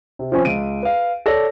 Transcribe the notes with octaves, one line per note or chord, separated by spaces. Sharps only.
C3
F3 C4 C#4
C#2 D7 D#7
B4 F5
A4 C#5 D5 A#6